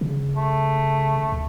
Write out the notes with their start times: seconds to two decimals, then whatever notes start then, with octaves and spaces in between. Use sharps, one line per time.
0.01 C#3
0.37 A3
1.32 D2